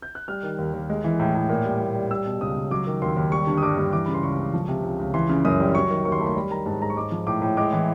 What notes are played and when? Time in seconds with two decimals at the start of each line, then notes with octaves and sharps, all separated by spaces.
0.02 G6
0.15 F#6
0.28 G3 F6
0.43 D#3
0.59 D#2
0.74 D#2
0.90 G#3
1.04 E3
1.20 A2
1.35 A2
1.49 A#2
1.65 G3
1.80 A#2
1.95 G3
2.10 G3 E6
2.26 B2
2.41 C#2 D#6
2.56 C#2
2.71 F#3 D6
2.87 D#3
3.02 D#2 C6
3.16 D#2
3.32 G3 C#6
3.47 D3
3.58 D#6
3.62 G2 D6
3.78 G2
3.93 E3 D6
4.06 C#3 B5
4.14 C6
4.23 C#2 C#6
4.39 C#2
4.54 F3
4.68 C3
4.84 C#2
4.99 C#2
5.14 E3 C6
5.29 C#3
5.45 F#2 D#6
5.60 G3
5.75 F#3 C#6
5.90 D#3
6.05 D#2 C#6
6.12 C6
6.20 A3 B5
6.27 C6
6.35 G3 B5
6.51 D#3 A#5
6.66 G#2 A5
6.81 G#2 A#5
6.90 C#6
6.96 G#3 D6
7.12 F3
7.27 A2 D6
7.42 A2
7.57 G#3 D6
7.73 E3